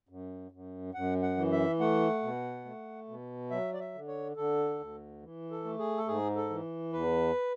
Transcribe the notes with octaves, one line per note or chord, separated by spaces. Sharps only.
F#2
F#2
F#2 F#5
F#5
E3
E5
A3 F#5
B2
A3
B2
F#3 E5
D5
E5
D3
C#5
D3 A4
D2
E3
A4
A3
G#4
A4
G#2 G#4
A4
E3
E2 B4